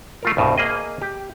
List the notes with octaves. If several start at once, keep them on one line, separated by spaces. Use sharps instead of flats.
A3 F4 A#4
C2 G2 B2
A#3 G#4 D#5
G4